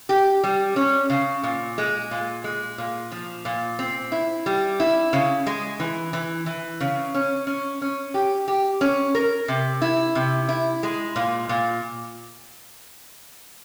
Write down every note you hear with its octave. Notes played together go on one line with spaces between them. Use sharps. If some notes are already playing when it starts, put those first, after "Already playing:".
G4
G3
C#4
C#3
A#2
G#3
A#2
G#3
A#2
F3
A#2
C4
E4
G3
E4
C#3
G#3
E3
E3
E3
C#3
C#4
C#4
C#4
G4
G4
C#4
A#4
C3
E4
C3
E4
G#3
A#2
A#2